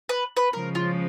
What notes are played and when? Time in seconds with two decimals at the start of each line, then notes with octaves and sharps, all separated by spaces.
0.09 B4
0.37 B4
0.53 C#3 F3 G#3 A#4
0.75 F4